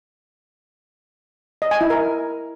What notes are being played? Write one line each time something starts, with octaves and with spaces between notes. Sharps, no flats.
D#5
G#5
E4
A#4